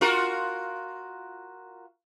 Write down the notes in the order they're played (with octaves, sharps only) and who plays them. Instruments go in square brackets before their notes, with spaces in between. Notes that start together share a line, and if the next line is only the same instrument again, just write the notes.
[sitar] F4 F#4 A#4